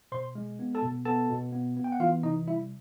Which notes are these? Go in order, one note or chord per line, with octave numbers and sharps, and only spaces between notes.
B2 C5 C6
G#3
B3
A4 A5
B2
B3 A4 A5
B2
B3
B3
G5
F#5
E3 F4 F5
C3 D#4 D#5
G3 E4 E5